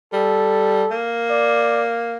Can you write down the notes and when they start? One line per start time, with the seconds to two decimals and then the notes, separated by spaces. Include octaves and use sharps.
0.13 G3 A4
0.91 A#3
1.30 D5